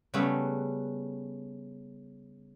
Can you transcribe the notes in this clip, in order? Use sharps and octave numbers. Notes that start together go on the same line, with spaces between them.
C#3 G3 A3 B3 C#4 B4